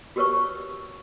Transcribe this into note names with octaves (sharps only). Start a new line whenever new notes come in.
F#4 G4 A#4 B4 C#5 C#6